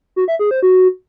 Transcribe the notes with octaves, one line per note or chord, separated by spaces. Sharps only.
F#4
E5
G#4
C5
F#4